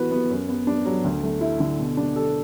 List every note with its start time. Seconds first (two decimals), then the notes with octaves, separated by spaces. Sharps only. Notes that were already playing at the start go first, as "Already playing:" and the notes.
Already playing: E3 B3 F#4 B4
0.11 B3
0.30 F#2
0.49 B3
0.67 D4
0.85 F#3
1.04 D2
1.23 A3
1.41 E4
1.60 D3
1.79 B2
1.97 D4
2.16 A4